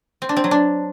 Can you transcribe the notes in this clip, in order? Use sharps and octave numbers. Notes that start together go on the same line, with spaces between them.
C4
D4
C4
F#3
D4